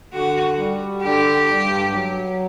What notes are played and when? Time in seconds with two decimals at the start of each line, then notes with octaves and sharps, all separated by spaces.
0.13 D3 F#4
0.58 G3
1.03 D3 G4
1.47 G2
1.92 F#3